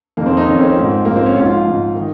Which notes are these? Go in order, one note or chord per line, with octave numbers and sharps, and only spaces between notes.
F2 D#3 A#3
C4
D#4
F2 D#3 C#4
C4
G#2 F3
G#2 F3 A#3
C4
C#4
G#2 F3 F4
F4
G#2 F3
D#3